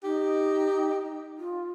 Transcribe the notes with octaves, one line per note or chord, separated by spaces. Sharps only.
D#4 G4
F4